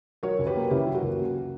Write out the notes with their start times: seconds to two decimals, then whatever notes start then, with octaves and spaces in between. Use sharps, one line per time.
0.23 F#3 A#4 C#5
0.39 C#2
0.47 G4 B4
0.56 A#3
0.71 C#3 E4 G4
0.87 F#3
0.94 F#4 A#4
1.02 C#2
1.19 A#3